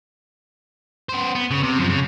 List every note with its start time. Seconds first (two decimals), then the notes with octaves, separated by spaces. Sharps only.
1.09 B3 C5
1.35 B3
1.51 C#3
1.63 C3
1.78 F#2 F3
1.90 C#3